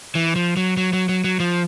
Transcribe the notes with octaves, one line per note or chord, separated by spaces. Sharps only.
E3
F3
F#3
F#3
F#3
F#3
F#3
F3